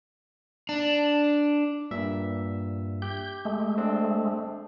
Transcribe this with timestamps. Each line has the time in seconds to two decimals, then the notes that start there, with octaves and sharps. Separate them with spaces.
0.69 D4
1.91 G2 A#2 E5
3.02 G4 G6
3.45 G#3 A3
3.78 C4 D4